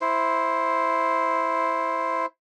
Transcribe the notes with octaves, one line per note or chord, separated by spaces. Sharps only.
E4 C5